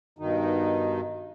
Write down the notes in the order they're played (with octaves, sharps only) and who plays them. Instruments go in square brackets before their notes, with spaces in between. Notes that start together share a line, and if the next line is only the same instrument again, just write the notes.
[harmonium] G2 B2 D#3 D#4